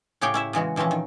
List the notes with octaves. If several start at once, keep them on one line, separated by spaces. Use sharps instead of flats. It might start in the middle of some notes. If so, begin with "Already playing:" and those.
A2 C#3 G4 G#4 C#5 G5
C#4 E4 E5
C#3 E3 G#3 F#4
A#2 E3 F3 C4 C#4
D#3